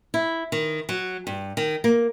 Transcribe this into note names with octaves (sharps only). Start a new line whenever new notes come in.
E4
D#3
F#3
G2
D#3
A#3